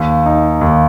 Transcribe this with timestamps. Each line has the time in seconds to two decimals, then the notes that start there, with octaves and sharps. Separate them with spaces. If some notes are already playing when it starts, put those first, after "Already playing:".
Already playing: D#2
0.26 D#4
0.61 D#2